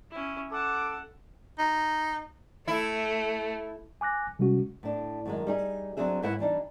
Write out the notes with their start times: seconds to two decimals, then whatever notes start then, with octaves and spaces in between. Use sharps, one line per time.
0.11 C#4 E4
0.52 A4 F#5 A5 D6
1.58 D#4
2.68 A3 E4
4.01 G#5 D6 F#6 A#6
4.39 C3 G3 G#3 C#4 F#4
4.83 A2 D4
5.26 F#2 D#3 G#3
5.47 G3 D#4 G#4
5.97 F#3 C4 D4 G#4 E5
6.22 G#2 G#3 E4 B4 C#5 F#5
6.39 E3 G3 D4 D#4